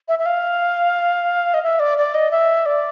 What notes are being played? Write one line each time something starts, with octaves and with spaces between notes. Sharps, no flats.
E5
E5
F5
D#5
E5
D5
D5
D#5
E5
D5